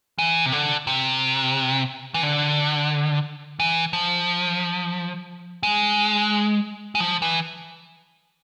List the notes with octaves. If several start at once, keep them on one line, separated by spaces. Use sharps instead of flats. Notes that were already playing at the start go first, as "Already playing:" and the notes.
E3
C3
D3
C3
E3
D3
E3
F3
G#3
G#3
F3
E3